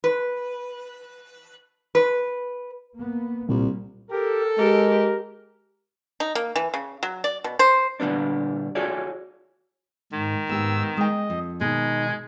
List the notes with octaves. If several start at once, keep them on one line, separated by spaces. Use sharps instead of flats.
B4
B4
A#3 B3
C2 A#2 G3 A#3
G4 A4 A#4
G#3 G4 A#4
D#4
A#3
E3
C#3
F#3
D5
B2
C5
A#2 D3 G3 B3 D4
F4 F#4 G#4 A4 C#5 D5
G#2 D#3
G#2 B3 G4 E6
G#3 D#5 G5
F2
B2 D#3 G#3 D#4